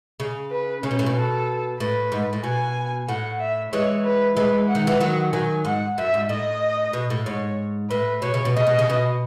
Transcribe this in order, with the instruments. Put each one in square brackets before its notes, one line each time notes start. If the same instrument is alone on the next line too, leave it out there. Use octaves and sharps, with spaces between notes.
[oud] C#3
[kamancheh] B4
[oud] C#3 [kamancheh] C#4
[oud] B2
A2
B2
[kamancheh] A4
[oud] A2 [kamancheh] B4
[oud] G#2
A2
[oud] B2 [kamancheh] G#5
[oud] A2 [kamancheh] F#5
[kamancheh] E5
[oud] E3 G#3 [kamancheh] C#5
[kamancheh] B4
[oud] E3 G#3 [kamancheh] B4
[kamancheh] F#5
[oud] D#3
E3
[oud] D#3 F#3 [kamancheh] F#5
[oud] D#3 F#3 [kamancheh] G#5
[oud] G#2 [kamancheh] F#5
[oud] F#2 [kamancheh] E5
[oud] G#2
[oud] A2 [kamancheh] D#5
[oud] B2
A2
[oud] G#2 [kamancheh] C#5
[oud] A2 [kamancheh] B4
[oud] B2 [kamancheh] C#5
[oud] C#3
B2
[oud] C#3 [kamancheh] D#5
[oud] B2
C#3
B2